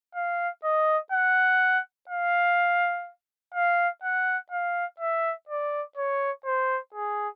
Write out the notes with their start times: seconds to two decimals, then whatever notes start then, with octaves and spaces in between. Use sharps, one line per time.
0.15 F5
0.64 D#5
1.12 F#5
2.10 F5
3.55 F5
4.03 F#5
4.52 F5
5.00 E5
5.49 D5
5.97 C#5
6.46 C5
6.94 G#4